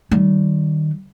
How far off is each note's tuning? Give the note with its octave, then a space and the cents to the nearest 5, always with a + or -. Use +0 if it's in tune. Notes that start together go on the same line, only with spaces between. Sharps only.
D#3 -20 G3 -35